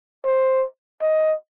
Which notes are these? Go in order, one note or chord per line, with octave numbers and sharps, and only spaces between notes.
C5
D#5